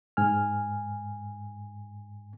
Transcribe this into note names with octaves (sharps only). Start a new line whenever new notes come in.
G#2 G#5 F6